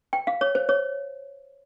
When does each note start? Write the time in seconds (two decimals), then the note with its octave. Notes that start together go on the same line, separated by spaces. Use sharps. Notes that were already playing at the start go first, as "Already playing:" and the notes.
0.13 G5
0.27 F5
0.41 C#5
0.55 C5
0.69 C#5